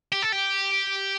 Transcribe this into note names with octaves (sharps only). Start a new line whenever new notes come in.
G4
A4
G4